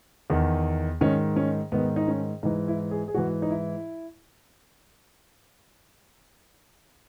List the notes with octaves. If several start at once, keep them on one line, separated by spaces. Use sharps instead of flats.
E2 D#3
G#2 D#3 C#4
C#4
G#2 D#3 B3
D#4
C#4
G#2 E3 D#4
E4
G#4
G#4
G#2 E3 F#4
D#4
E4